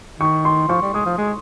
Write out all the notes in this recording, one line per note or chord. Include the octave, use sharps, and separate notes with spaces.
D#3 C#6
C6
F3 C#6
G3
G#3 D#6
F3
G#3